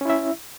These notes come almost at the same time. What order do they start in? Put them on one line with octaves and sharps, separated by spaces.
C#4 E4 E5